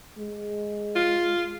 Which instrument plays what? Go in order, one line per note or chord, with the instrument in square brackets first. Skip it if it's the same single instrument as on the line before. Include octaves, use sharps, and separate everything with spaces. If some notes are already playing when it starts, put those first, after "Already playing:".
[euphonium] G#3
[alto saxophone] F4